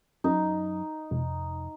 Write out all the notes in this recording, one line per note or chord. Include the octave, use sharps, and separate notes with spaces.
F#2 D#4
F1